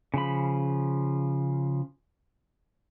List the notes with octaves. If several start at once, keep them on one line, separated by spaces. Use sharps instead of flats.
C#3 F3 B5